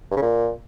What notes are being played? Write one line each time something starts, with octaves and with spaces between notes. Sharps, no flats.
G2
C#3
A#2